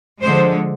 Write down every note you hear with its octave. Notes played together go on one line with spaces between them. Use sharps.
D3 F3 G#3 C5